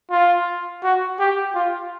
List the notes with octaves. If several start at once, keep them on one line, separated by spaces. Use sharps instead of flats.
F4
F#4
G4
F4